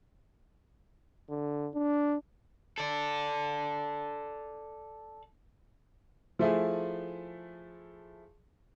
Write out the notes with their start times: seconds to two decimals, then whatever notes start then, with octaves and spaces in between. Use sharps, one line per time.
1.30 D3
1.74 D4
2.78 A4 D5
6.39 F3 A3 E4 G#4